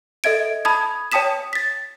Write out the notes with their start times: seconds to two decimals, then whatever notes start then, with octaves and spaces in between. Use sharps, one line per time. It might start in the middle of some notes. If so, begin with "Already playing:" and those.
0.24 A4 D#5 E5 G#6 D7
0.65 A5 B5 D#6 G#6
1.12 C#5 G5 A5 D#6 B6 E7
1.53 A6 B6